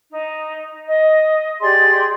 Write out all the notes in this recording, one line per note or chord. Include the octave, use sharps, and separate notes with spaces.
D#4
D#5
G4 G#4 D5 C6